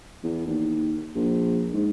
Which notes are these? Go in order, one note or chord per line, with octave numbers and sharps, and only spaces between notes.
E2
D#2
A#1
G#2